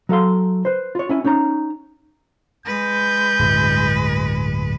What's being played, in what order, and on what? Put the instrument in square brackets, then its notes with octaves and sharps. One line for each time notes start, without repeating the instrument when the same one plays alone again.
[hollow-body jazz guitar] F#3 A4 F5 C6
B4 C5
F4 C#5
C#4 E4 G#5
C#4 D#4 C#5 A#5
[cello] G#3 B4 [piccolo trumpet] G6
[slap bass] D1 G2